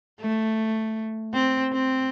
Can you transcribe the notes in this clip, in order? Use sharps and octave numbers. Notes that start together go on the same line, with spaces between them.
A3
C4
C4